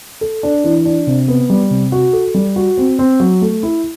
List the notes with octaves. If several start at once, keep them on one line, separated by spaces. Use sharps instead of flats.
A4
D4
E3
D4
C3
B3
G3
C3
F#4
A4
G3
F#4
C4
C4
F#3
A3
E4